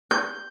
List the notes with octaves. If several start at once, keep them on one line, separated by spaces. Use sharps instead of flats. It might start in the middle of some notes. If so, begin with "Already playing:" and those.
G6